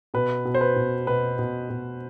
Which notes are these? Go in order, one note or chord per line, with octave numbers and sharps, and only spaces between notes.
B2 B4
B2
C5
B4
B2
B2 B4
B2
B2